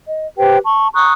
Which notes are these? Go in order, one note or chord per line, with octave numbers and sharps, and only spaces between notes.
D#5
G4 B4 C5 G5
A5 C#6
A#5 C#6 D#6 F#6